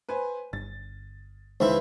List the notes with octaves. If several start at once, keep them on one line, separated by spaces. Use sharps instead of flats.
B4 C5 G#5
G1 A6
C#2 D#3 E3 E4 C5 E5